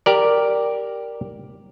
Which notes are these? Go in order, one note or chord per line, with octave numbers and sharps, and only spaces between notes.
G4 A#4 D5